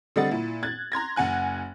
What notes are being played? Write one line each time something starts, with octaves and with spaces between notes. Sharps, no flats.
D3 G3 C4 D#5 F#5 A6
A#2 E4
F#6 G#6 A6
A#5 C6 G#6 A#6
F#1 F#5 G#5 F#6